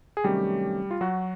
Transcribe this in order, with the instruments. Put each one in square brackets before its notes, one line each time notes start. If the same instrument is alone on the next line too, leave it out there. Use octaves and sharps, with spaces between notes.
[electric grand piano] G#4
C3 D#3 F#3 G3 A3 C#4 G4
F4
F#3 F#4